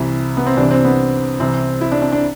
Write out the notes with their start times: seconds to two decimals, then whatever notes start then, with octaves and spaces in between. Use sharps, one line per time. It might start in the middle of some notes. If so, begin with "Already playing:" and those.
Already playing: C2 C3 E3 E4
0.37 B3
0.46 C4
0.57 C2 C3 E3 D4
0.71 C4
0.84 B3
1.40 C2 C3 E3 C4
1.81 E4
1.92 D4
2.02 D4
2.12 D4